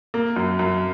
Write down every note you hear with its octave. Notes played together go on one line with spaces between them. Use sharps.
A#3
F#2
F#2